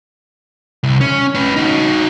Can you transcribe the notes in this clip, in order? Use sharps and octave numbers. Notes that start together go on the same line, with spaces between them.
C2
C#4
C#4 B4
D#4 F#4